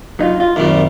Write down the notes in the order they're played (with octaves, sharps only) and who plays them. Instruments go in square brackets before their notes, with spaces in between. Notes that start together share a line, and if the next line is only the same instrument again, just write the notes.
[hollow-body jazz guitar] F#3 D#4 F4
F4
[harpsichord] F#2 A#2 G3 [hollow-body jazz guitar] D#3 C4